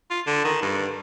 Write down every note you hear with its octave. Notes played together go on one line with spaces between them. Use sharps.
F4
D3
D#3
G2